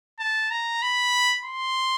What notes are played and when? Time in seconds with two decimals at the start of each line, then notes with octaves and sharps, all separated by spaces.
0.19 A5
0.51 A#5
0.82 B5
1.45 C6